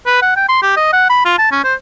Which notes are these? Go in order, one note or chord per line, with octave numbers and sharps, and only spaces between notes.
B4
F#5
G5
C6
G4
D#5
F#5
B5
F4
A5
C#4
C5